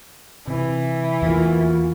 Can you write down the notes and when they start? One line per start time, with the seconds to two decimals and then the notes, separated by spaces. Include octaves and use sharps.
0.47 C3 E3
1.22 E2 A#3 F4 F#4